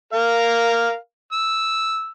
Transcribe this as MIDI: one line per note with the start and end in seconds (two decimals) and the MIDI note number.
0.13 0.95 70
0.13 0.95 77
1.32 2.11 88